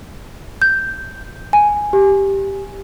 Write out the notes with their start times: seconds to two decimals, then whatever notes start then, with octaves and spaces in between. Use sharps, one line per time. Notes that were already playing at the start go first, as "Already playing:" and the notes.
0.62 G6
1.53 G#5
1.93 G4